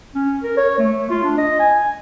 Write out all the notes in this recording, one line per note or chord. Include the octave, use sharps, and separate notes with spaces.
C#4
A#4
C#5
A3
F4
D4
D#5
G#5